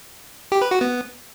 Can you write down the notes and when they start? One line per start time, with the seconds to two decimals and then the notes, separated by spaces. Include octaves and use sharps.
0.52 G4
0.62 B4
0.71 F#4
0.81 B3